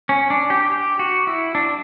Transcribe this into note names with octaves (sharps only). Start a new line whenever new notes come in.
C#4
D4
G4
G4
F#4
E4
D4